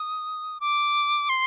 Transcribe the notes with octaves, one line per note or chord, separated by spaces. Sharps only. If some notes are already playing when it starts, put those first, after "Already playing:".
Already playing: D#6
D6
C6